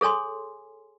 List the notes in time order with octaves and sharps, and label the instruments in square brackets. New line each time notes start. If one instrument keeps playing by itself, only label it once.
[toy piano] G#4 A4 C#5 G#5 C6